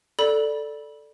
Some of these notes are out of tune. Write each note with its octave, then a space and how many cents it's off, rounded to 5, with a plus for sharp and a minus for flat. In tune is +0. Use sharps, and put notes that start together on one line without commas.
A4 +0 D5 +0 B5 -25